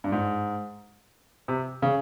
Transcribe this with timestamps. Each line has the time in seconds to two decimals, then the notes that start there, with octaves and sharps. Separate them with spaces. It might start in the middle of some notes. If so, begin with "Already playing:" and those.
0.04 G2
0.12 G#2
1.48 C3
1.82 C#3